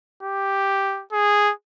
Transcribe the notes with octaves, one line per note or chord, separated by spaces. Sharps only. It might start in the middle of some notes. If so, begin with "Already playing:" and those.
G4
G#4